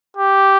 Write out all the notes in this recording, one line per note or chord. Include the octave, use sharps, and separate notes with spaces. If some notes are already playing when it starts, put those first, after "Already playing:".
G4